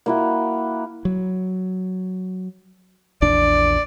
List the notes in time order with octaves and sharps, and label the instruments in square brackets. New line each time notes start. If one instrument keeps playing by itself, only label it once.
[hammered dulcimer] A#3 E4 F#4
[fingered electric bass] F#3
[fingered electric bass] A#1 E2 D4 [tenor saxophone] D5